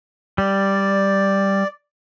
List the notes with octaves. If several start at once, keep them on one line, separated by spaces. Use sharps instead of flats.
G3 D5